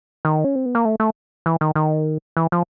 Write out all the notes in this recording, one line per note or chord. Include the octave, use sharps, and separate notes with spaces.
D#3
C#4
C4
B3
A#3
A3
A3
E3
D#3
D#3
E3
F3